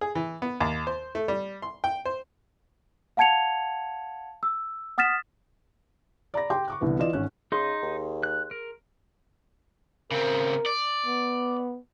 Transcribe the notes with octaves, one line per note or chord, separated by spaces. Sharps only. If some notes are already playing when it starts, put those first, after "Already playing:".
G#4
E3
B3
D#2
C5
A3
G3
C6
G5
C5
F5 F#5 A5 G#6 C#7 F7
E6
F#5 D#6 F6 A6 B6 E7
D5 A#5 B5 A#6
G4 G5 C6 D6
C#6 D6 F#6
C2 D3 E3 B3
E3 F4 D5 D#5 E7
G#1 C#4 C#5 F#6
C#3 D#4 G#4 C6
D#2
F#6
A#4
C#3 C4 A#4
D5
B3